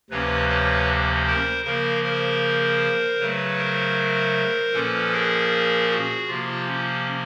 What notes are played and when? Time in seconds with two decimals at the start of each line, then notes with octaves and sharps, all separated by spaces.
0.10 D2 C3 F3 A#3 C#4 B4 C#5
0.49 B4 C#5
1.26 A#4 C5
1.64 C#3 F3 A#3 A#4 C5
2.04 A#4 C5
3.20 C#3 F#3 A3 B4 C#5
3.58 A#4 C5
4.73 A#2 F3 A#3 C#4 A4 B4
5.12 G#4 A#4
5.90 F#4 G#4
6.28 C3 F3 A#3 F4 G4
6.67 C#4